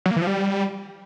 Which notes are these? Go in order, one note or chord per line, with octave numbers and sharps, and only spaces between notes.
F#3
A#3
E3
F3
G3